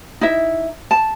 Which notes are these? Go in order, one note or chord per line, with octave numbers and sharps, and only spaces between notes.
D#4 E4 E5
A5